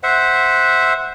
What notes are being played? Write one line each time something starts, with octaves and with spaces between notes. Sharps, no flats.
C5 E5 F#5